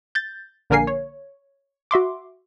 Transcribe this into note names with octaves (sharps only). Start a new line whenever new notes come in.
G6 A6
A#1 D3 A#3 A#4 G#5 C7
C#5
F#4 E5 C6 D6